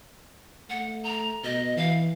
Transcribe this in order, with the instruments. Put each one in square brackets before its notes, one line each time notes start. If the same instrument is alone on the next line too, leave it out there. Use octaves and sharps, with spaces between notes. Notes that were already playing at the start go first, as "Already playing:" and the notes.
[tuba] A3 [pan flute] F#5
[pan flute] A#5
[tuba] B2 [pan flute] D#5
[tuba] E3 [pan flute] F5